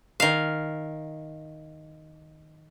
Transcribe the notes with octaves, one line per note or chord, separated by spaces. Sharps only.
D#3 F5